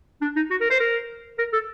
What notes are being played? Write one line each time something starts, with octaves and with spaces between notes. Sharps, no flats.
D4
D#4
F#4
A#4
C5
A#4
A#4
A4